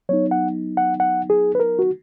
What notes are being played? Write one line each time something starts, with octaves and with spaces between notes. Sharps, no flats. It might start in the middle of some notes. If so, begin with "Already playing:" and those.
F#3 B3 D#4 C#5
F#5
F#5
F#5
G#4
B4
A#4
F#4